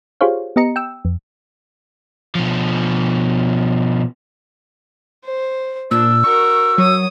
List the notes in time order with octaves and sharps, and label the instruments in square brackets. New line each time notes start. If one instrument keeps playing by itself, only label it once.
[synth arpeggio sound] F4 G4 G#4 C5 C#5 F5
B3 G4 D#5 A#5 C#7
G5 E6
F2
[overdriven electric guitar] B2 F3
[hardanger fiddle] C5
[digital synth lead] A#2 [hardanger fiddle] D4 [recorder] E6
[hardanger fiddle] F#4 A#4 [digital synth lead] C#6
[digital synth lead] F#3 [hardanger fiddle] C#5 D#6